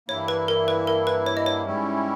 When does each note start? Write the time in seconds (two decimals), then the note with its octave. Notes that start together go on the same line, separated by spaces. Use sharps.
0.08 G2 E3 A#3 E4 C#5
0.28 B4
0.48 A#4
0.68 B4
0.87 A#4
1.07 B4
1.26 C#5
1.37 D#5
1.46 C#5
1.66 G#2 G3 C#4 E4